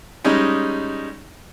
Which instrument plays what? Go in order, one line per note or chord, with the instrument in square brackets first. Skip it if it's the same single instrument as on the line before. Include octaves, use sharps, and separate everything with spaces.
[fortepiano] G3 G#3 C#4 D#4